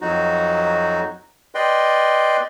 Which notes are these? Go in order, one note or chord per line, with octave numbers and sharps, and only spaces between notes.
F2 F#3 D#4 F#4
B4 D5 D#5 G5 C6